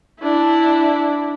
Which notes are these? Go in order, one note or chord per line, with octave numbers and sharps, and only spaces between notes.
D4 E4